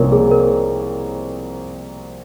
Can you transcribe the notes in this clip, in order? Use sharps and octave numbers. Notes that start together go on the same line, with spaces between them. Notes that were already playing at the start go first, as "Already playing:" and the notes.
Already playing: C2 C3 F3 A#3 C#4 A#4 C#5
G#4
A#4